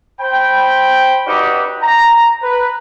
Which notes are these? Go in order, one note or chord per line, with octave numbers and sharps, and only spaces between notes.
C5 G5 B5
C#4 D#4 F#4 G4 B4 D5
A#5
B4